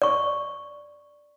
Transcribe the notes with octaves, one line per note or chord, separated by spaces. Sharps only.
D5 C#6